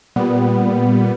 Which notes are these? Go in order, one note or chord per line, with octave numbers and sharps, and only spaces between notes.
A#2 G3 B3